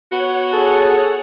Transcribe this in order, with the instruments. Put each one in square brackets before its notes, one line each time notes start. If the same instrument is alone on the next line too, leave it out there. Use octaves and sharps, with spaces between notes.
[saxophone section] B3 F#4 [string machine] C#5 F#5
[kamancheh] G#4 [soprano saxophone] A4